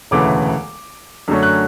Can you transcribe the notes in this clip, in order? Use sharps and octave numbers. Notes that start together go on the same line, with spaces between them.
E1 D2 C#3 E3 A3 D6
F#2 D3 F#3 A3 C#4
F#6